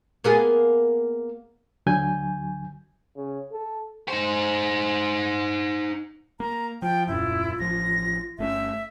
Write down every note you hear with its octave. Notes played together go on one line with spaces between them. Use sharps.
A#3 B3 G#4
D2 D3 F#3 G#5 G6
C#3
A4
D#4 C5
A#3 A#5
F3 F4 G5
D#1 F#2 A#2 E4 F4
A1 F3 A#6
G1 A3 C#4 E5